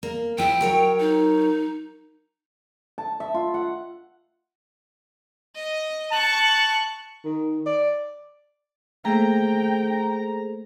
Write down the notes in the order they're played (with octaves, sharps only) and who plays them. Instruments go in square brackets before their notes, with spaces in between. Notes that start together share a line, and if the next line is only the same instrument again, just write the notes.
[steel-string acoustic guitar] A#3
[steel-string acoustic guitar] F3 E4 [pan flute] G5
[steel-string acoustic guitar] F#3 A#4 C#5
[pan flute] D#4
[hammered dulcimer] A5
E5
F4
F#5
[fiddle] D#5
[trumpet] A5 [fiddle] C#6 F#6
[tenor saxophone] D#3
D5
[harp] A3 A#3 [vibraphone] G#4 A4 C5 [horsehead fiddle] G5 [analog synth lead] A#5